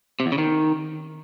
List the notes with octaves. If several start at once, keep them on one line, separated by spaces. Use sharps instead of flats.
C3
E2
C#3
D#3